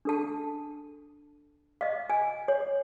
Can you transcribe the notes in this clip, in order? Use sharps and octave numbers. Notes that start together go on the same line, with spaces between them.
D4 A4 A5
D#5 F5
G#5
C#5